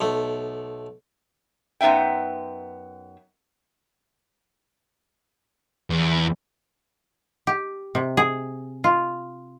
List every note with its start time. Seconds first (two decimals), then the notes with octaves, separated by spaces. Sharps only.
0.01 B1 A3
1.81 F#2 B3 D#4 E5 G5
5.90 E2
7.47 G4
7.95 C3
8.17 G#4
8.84 F4